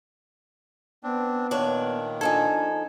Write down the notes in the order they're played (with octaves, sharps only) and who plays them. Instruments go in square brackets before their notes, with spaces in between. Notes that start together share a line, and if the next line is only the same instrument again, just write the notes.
[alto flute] B3 [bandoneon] C4 D4
[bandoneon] A#2 D#3 [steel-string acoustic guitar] D4 B4 C#5
[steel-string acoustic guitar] F3 D#4 A4 [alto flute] D4 [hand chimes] G#5 G#6